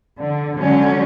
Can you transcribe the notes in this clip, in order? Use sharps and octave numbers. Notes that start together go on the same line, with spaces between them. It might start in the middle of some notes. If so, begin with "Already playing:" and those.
D3
D3 F#3 G#3 C#4